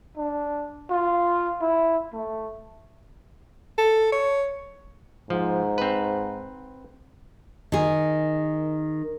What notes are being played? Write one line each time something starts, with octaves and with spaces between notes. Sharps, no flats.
D4
F4
E4
A3
A4
C#5
G#2 F3
C4 B4
D#3 G#4